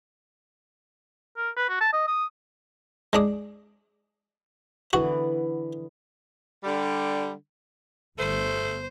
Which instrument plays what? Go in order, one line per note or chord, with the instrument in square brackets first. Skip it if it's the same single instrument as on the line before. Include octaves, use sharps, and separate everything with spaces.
[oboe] A#4
B4
F#4
A5
D#5
D#6
[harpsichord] G#3 D4 D#6
[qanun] D3 E3 B3 [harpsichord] F#4
[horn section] D3 G3
[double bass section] G1 [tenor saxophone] A3 [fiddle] C5